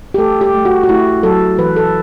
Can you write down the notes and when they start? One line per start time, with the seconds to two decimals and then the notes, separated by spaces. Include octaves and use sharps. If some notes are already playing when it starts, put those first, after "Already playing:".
0.14 G4
0.18 A3 A4
0.41 G4
0.54 A3
0.65 F#4
0.83 F#4
0.89 A3 E4
1.23 F#3 A4
1.58 E3 B4
1.76 A4